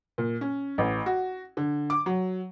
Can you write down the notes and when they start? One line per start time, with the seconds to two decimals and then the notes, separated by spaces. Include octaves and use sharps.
0.18 A#2
0.41 C#4
0.78 A1
1.06 F#4
1.57 D3
1.90 D6
2.06 F#3